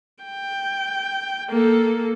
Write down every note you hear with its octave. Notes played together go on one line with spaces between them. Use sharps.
G5
A#3 A4